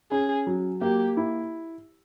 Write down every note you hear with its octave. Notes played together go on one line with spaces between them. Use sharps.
C#4 G#4
F#3
A#3 G4
E4